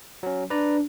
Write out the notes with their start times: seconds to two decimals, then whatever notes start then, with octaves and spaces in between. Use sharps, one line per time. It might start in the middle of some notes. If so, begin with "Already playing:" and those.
0.23 F#3 C#4
0.50 D4 B4 D5 A#5